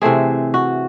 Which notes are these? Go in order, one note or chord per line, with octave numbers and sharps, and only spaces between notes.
C3 E3 A3 C4 G#4
F#4